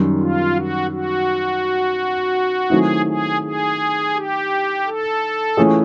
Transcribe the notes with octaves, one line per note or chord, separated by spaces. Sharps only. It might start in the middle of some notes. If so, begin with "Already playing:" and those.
Already playing: F#2 D#3 G3
F4
F#4
F#4
D#3 F#3 A3 C4 E4 G#4
G#4
G#4
G4
A4
E3 A3 C#4 F4 G#4